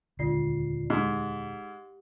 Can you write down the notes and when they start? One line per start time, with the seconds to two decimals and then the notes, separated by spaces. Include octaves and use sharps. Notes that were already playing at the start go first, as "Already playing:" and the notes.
0.19 D#1 C#2 D3 F4 D5 C7
0.90 G#2 G4